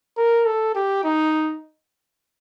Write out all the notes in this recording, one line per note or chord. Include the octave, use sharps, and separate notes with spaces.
A#4
A4
G4
D#4